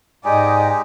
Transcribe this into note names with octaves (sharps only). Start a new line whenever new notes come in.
G#2 G#3 D#4 G4 D5 D#5 G#5